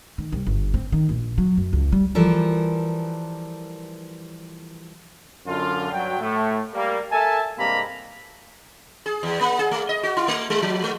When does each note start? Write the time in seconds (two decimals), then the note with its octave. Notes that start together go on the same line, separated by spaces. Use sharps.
0.18 D#3
0.32 C2
0.47 G1
0.74 C4
0.92 D#3
1.09 A#1
1.38 F#3
1.57 F#2
1.73 C#2
1.92 G3
2.15 E3 F3 G3 A4 A#4
5.46 F#2 D3 F4
5.91 G2 F#3 G5
6.20 A2 A3
6.73 G3 A#3
7.11 A4 A#4 E5 G#5 A5
7.58 G2 C3 G#3 A#3 A#5 B5
9.06 G#4
9.23 E2
9.41 A#3
9.59 G#4
9.71 A3
9.89 D#5
10.03 F#4
10.17 E4
10.28 A3
10.50 G3
10.62 F3
10.84 G#3